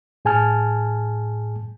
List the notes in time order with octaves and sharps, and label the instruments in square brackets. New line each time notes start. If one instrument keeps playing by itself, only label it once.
[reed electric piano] A2 G#4 G#5 A5 F6